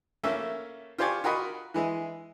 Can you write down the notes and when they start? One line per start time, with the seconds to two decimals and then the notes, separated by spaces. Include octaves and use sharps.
0.23 A3 A#3 C#4 E4 E5
0.98 F4 G4 C5 D5 G#5 C#6
1.24 F4 F#4 A#4 D#5 B5 C#6
1.74 E3 G#3 E4